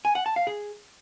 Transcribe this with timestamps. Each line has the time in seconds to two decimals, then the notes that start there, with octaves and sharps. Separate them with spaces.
0.05 G#5
0.15 F#5
0.26 A5
0.36 F5
0.47 G#4